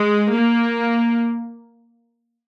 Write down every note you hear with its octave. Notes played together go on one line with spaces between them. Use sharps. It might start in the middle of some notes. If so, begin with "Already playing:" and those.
Already playing: G#3
A#3